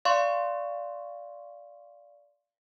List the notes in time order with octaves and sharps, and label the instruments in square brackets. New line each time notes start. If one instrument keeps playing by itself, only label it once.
[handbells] D5 F5 C6 C#6